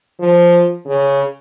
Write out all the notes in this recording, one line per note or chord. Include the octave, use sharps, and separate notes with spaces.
F3
C#3